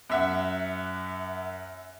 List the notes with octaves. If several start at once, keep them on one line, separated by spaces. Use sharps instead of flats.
F#2 E5 F#5